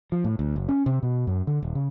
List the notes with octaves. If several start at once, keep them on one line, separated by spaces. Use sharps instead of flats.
F3
A2
D2
F#1
C#4
C3
B2
F#2
D3
D#1
C#3